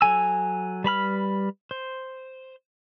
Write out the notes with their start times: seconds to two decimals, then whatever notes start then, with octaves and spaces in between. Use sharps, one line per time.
0.01 F#3 A4 G#5 E6
0.84 G3 B4 B5 F6
1.71 C5